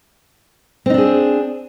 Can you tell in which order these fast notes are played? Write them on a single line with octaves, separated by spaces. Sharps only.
C4 D#4 D4 G#4